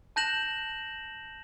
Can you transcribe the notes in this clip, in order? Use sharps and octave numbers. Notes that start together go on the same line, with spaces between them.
A5 F#6 G6 A#6 E7 F#7